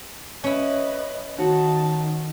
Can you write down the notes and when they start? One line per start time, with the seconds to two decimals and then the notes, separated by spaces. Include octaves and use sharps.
0.44 C#4 E4 B4 D#5
1.38 D#3 D#4 F#4 C#5 A5